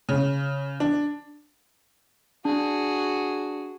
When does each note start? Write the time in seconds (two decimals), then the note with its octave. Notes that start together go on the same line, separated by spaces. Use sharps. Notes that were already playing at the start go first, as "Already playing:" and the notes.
0.09 C#3
0.80 D4
2.45 D4 F#4 G#4